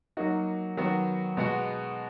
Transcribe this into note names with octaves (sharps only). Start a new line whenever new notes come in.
F#3 A#3 D#4 F#4
D#3 F#3 B3 F#4
B2 G#3 B3 F#4